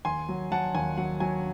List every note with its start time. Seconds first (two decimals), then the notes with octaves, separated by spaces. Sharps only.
0.05 D#2 G#5 C6
0.29 F#3
0.51 F#3 F#5 A5
0.75 D#2 G#5
0.97 F#3 F#5
1.20 F#3 G#5